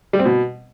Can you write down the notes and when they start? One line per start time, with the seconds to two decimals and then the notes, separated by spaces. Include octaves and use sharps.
0.13 G3
0.19 C4
0.25 B2